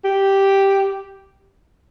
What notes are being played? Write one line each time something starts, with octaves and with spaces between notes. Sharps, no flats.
G4